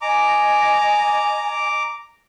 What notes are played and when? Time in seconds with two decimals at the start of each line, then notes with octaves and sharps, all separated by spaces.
0.01 D#5 G#5 A#5 D6